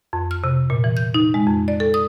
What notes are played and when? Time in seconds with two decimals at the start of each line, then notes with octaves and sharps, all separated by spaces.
0.13 F2
0.31 F6
0.44 C3
0.70 A#2
0.84 E3
0.97 G6
1.14 D#4
1.34 G#3
1.47 F2
1.68 D5
1.80 A4
1.94 D#6